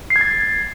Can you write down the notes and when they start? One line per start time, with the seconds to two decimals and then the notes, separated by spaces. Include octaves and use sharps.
0.10 C7
0.16 G#6
0.21 A6